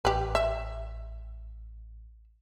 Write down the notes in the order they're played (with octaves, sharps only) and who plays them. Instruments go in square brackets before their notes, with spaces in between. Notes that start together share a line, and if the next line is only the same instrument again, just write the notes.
[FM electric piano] A1 [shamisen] G4 B4
[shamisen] E5